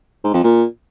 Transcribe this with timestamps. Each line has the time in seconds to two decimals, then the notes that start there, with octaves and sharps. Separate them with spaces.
0.24 G#2
0.34 F2
0.44 A#2